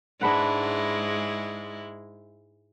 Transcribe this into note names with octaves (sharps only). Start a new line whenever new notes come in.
G#2 G#3 D4 E4 B4 F#5